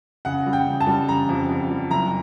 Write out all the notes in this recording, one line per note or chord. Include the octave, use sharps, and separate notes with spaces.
C#3 F#5
G3
G5
C#3
A5
G3
C#3 A#5
F2
F2
G3
F#1 A#5